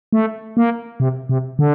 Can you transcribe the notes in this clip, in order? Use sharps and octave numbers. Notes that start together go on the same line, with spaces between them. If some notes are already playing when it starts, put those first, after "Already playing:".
A3
A#3
C3
C3
D3